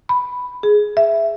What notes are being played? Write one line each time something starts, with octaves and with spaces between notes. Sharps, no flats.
B5
G#4
E5